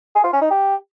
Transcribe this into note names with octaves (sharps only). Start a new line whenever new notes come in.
G#4
F4
C#4
D#4
G4